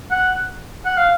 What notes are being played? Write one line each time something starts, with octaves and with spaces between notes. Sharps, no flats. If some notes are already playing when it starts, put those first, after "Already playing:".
F#5
F#5
F5